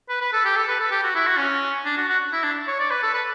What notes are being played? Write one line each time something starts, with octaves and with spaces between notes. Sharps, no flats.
B4
B4
A4
G4
A4
B4
A4
G4
F#4
E4
F#4
C#4
D4
F#4
F#4
E4
D4
C#5
D5
B4
A4
B4